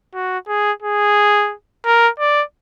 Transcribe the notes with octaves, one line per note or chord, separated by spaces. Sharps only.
F#4
G#4
G#4
A#4
D5